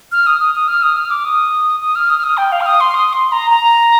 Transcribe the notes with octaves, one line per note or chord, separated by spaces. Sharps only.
F6
D#6
D#6
D#6
F6
D#6
F6
D6
D#6
D#6
F6
D#6
F6
D#6
G5
F5
F6
D#6
C6
D#6
C6
A#5
A#5